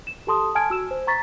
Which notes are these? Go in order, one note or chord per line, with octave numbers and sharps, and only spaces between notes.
E7
G4 A4 A5 C6 D#6
G#5 A5 F6 G#6 D7
F#4 E6 E7
C5
A#5 C#6 A6 B6